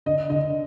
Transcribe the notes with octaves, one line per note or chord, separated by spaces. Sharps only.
D3 D#5
D3 D#5